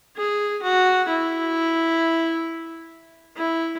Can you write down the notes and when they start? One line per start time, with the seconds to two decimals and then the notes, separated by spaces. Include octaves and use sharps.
0.16 G#4
0.62 F#4
1.08 E4
3.37 E4